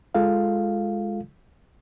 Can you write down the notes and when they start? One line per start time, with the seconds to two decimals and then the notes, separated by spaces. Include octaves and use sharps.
0.15 G#3 F4 A4 F5